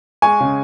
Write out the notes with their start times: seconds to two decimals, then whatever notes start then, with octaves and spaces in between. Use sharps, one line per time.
0.22 G#3 G#5 C#6
0.41 C#3